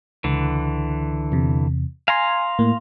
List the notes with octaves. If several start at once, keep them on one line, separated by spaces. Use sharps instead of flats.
C#2 D3 E3
E2 C3
F5 G#5 A#5 C6
A2 A#3